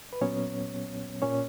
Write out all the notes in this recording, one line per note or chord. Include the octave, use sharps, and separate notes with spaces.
B4
A#2 F#3 B3 C#4 C#5
A#2 A#3 C#4 C#5